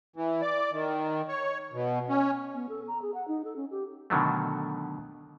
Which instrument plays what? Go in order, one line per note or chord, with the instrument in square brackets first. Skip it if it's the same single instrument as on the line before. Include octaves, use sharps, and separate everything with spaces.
[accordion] E3
D5
D#3
C#5
B2
C#4
[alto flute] B3
A4
A#5
G#4
F#5
D#4
A4
C#4
G4
[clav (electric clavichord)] B2 D3 D#3 F#3 A3